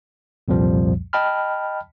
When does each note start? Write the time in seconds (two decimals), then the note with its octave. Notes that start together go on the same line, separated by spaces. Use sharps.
0.48 C2 F2 A#2 F3 G3
1.13 D#5 G5 A5 B5 F6